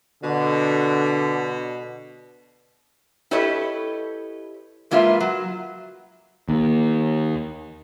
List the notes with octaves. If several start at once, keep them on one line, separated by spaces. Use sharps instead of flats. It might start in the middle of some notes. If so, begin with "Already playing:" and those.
B2 D3
E4 G4 A4 B4 C#5 D#5
A#2 G#3 A#3 F4 B4 E5
F#3
D#2